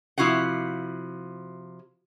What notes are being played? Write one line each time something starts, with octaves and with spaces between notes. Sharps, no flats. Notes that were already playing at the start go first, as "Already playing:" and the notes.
C3 F3 E4 F#4 F5 F#5